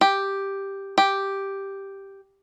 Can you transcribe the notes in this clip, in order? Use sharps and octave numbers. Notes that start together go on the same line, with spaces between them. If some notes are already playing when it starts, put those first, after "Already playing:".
G4
G4